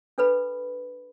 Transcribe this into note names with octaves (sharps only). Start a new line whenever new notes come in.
D4 A4 B4 B5